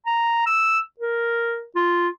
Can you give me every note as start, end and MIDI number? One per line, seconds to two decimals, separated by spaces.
0.06 0.45 82
0.46 0.80 88
0.99 1.64 70
1.75 2.08 65